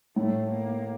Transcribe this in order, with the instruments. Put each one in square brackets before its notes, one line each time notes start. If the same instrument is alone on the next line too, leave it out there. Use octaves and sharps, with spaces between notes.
[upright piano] A2 [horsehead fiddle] A3
[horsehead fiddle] A#3